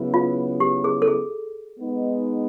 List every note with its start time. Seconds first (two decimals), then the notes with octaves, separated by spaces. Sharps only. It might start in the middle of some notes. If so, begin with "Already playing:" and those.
Already playing: C#3 F#3 B3 E4
0.14 F4
0.60 G4
0.84 G#4
1.02 A4
1.08 G#4
1.79 G#3 B3 D#4